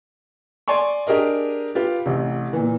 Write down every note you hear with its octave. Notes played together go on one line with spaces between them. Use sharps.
D5 G#5 C6 C#6
D4 G4 G#4 A#4 D#5
F4 G4 B4
A1 C3
A#2 E3